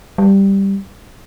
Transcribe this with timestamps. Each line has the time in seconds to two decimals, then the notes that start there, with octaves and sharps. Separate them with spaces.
0.18 G3